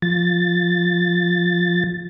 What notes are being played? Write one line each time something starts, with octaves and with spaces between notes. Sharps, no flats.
F3 A6